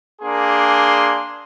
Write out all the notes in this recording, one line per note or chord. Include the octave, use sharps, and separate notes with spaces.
A#3 D4 G#4 C6